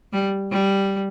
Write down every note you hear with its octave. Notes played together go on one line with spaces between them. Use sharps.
G3
G3